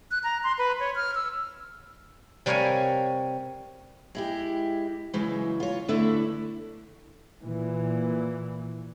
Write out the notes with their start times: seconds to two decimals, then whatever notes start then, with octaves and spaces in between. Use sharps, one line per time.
0.11 F#6
0.24 A#5
0.43 C6
0.58 B4
0.80 C#5
0.95 F6
1.15 E6
2.46 C3 G3 A#4 C#5 F5 G#5
4.15 G#3 E4 G4
5.13 C#3 E3 F#3 G#3
5.60 F4 C#5
5.88 E2 D3 A3 E4 E5
7.42 A#2 E3